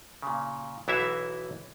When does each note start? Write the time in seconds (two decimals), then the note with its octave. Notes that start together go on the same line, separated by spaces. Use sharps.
0.22 A#2 C#3
0.88 B1 E3 E4 F#4 E5 F5